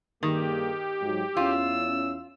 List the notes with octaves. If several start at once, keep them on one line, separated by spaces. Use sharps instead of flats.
G2 D#3 A#3 G4 G#4
G#2 F#3
E2 C#4 E4 F4 E6